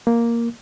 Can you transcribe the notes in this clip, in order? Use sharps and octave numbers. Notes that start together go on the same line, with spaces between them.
A#3